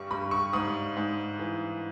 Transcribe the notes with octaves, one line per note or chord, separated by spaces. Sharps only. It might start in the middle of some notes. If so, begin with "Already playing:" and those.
Already playing: G2 G3 C#6
G2 B5
C#6
G#2 D#6
G#2
E3